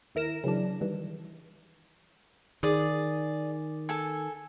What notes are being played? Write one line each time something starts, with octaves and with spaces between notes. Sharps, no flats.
D#2 E4 A#4 A#6 E7
C#3 E3 F#3 D4
D#3 E3 G3
D#3 G#4 D5
A4 G#5